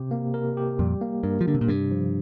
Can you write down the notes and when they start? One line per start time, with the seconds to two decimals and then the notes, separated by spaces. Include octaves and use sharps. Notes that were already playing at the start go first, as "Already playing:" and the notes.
Already playing: C3 G4
0.11 A#3
0.34 A#4
0.57 G4
0.79 F2 A#2 G3
1.01 A#3
1.23 G2 A#4
1.41 F3
1.47 D3 D4
1.55 C3
1.61 A#2
1.68 G2 C3
1.91 F3